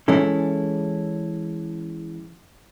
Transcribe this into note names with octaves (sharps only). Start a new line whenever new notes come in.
E3 G#3 C#4 E4 A4